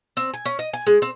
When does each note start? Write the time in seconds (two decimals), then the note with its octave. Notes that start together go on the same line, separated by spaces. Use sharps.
0.17 C4
0.34 G#5
0.46 C#4
0.59 D#5
0.73 G#5
0.87 G#3
1.02 C4